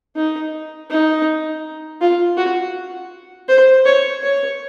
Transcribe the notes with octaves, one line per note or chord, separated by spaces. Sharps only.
D#4
D#4
F4
F#4
C5
C#5
C#5